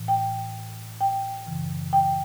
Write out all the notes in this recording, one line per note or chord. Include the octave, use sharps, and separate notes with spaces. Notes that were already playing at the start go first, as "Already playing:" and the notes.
Already playing: A2 E3
G5
G5
F#2 C#3 E3
G5